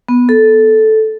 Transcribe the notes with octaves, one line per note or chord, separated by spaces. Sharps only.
B3
A4